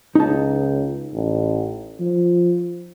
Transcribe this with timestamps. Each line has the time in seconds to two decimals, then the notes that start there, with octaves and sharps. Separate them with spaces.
0.15 C#2 D#4 A5
1.13 A1
2.00 F3